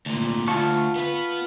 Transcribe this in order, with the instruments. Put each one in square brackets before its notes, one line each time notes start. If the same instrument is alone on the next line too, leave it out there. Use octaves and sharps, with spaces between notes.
[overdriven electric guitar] D2 A#2
[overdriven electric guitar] D2 [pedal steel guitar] F4 A5 C#6
[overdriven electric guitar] B3 B4